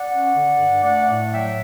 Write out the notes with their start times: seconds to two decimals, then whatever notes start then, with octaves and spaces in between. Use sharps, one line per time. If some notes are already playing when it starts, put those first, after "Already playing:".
Already playing: D5 F#5
0.11 C#4
0.35 D3
0.59 G2
0.83 A3 D5 F#5
1.08 A2
1.32 F#3 E5 G5